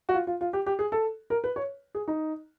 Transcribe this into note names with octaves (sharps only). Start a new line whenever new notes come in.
F#4
F4
F4
F4
G4
G4
G#4
A4
A#4
B4
C#5
G#4
D#4